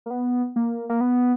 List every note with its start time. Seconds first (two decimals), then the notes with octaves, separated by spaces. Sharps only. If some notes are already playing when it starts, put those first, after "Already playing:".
0.06 A#3
0.10 B3
0.56 A#3
0.89 A#3
1.01 B3